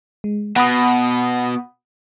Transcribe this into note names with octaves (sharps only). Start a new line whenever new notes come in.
G#3
B2 F#5 B5 D#6